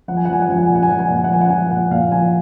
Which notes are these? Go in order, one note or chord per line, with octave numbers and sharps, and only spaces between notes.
F3 F#5
G#5
F#5
F3 G#5
F#5
F3 G#5
F#5
G#5
A#2
F#5
G#5
F3 F#5
G#5
A#2 F#5
G#5
F#5
F3 G#5
F#5
F3 G#5
F#5
A#2 F#5
A#2 F5
F3 G#5